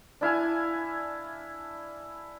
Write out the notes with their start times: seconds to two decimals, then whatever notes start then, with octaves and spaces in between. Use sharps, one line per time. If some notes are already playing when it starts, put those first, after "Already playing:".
0.21 D4 E4 F5 G#5